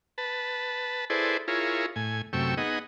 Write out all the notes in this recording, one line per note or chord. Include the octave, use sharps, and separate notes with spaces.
B4 A5
E4 G#4 A4 B4 C5 D5
E4 F4 G#4 A#4 C#5
A2 G#5
F#2 C3 A3 G5 C#6 E6
B3 D#4 G#4 D#5 F#5